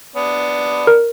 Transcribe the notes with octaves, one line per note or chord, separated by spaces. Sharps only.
B3 D4
A#4